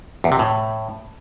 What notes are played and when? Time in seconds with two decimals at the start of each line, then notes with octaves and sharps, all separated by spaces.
0.24 E2
0.32 C3
0.39 A2